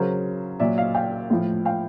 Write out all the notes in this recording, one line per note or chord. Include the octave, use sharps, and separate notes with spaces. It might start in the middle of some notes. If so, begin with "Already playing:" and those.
Already playing: C#3 F#3 A#4 C5
A#2 F#3 D5 E5
D#5 F5
F5 G5
A2 F3
F5 G5